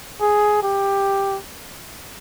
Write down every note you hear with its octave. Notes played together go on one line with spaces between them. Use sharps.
G#4
G4